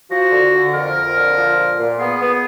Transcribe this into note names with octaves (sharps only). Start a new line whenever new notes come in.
F3 F#4
D3
D3
F2 A#4
F2
D3
F3
A#2
A#2
B3 G#4
B3